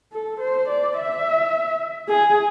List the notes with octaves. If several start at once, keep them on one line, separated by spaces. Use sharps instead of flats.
A4
C5
D5
E5
G#4